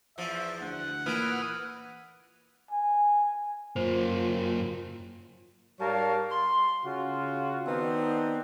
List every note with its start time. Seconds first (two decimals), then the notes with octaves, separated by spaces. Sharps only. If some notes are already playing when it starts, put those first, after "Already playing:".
0.18 E2 F3 E5
0.60 D2 F#5
1.06 A#2 E3 B4 D#6 F6
2.71 G#5
3.76 F#2 A#3 F4 C5
5.80 G#2 G3 A#4 C#5 F5 A5
6.31 C6
6.85 C#3 F4 F#4
7.66 D#3 B3 C4 D4 D#4